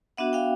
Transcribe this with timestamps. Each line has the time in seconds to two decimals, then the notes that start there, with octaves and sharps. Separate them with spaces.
0.17 B3 D4 F#4 E5 F#5
0.33 F5 G5